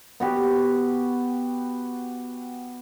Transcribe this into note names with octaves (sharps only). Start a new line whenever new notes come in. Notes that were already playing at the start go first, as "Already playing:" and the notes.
B3 F#4 G4